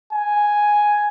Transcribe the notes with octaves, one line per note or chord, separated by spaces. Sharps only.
G#5